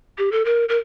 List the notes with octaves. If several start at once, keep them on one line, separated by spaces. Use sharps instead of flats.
G4
A4
A#4
A#4